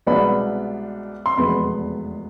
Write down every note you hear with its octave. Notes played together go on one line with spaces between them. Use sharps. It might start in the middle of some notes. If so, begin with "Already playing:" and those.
C2 B2 G#3 B3 D4 B5
C6
F1 E2 B2 G#3 B3 B5